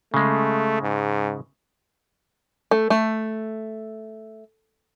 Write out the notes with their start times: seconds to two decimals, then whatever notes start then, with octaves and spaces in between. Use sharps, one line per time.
0.14 C#3 G#3 A3
0.82 G#2
2.71 A3
2.90 A3